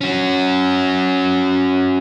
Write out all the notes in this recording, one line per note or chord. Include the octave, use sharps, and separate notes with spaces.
C#4 F#4